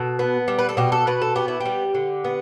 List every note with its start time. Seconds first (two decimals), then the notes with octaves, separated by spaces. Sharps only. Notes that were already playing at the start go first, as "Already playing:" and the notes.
Already playing: B2 A4
0.19 B3
0.48 G3
0.59 B4
0.69 A4
0.77 B2 G4
0.92 A4
1.07 B2 B4
1.22 A4
1.36 B3 G4
1.48 E4
1.60 G4
1.65 G3
1.95 D3
2.24 B3